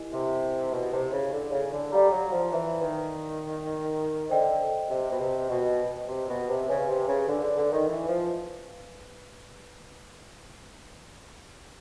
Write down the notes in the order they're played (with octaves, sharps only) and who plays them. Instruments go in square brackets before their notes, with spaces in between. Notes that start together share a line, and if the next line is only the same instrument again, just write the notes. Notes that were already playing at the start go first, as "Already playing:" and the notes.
Already playing: [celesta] E4 G4 A#4 D#5 G#5
[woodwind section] C3
B2
C3
C#3
D3
C#3
D3
[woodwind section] G3 [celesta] A4 D5 F5 A#5
[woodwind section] F#3
F3
E3
D#3
[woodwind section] D3 [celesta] C5 D#5 G5
[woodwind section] C3
B2
C3
B2
C3
B2
C3
[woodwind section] C#3 [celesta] B4 D5 F5 G#5
[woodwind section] C3
C#3
D3
D3
D3
D#3
E3
F3